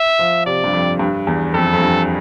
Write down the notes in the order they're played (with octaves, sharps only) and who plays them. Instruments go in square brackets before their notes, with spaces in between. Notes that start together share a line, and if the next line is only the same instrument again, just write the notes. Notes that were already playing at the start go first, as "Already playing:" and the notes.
Already playing: [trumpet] E5
[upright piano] F3
[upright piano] C3 [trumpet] D5
[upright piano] G2
F2
G2
E2
[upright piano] F2 [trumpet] A4
[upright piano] F2
G2